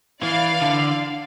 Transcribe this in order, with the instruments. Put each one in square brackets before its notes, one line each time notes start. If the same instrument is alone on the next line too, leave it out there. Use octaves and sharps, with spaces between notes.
[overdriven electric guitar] E3 [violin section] D5 F5
[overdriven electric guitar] D3